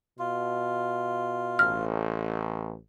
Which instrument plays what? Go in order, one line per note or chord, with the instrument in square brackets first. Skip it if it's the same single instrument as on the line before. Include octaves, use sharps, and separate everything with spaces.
[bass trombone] B2 [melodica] F4
[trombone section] A1 [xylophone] F6